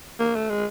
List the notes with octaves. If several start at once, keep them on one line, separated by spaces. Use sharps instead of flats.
A#3
A3
G#3